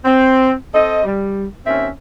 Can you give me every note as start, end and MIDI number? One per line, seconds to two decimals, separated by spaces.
0.03 0.52 60
0.72 1.03 60
0.72 1.03 69
0.72 1.03 75
1.03 1.45 55
1.65 1.87 39
1.65 1.87 60
1.65 1.87 61
1.65 1.87 76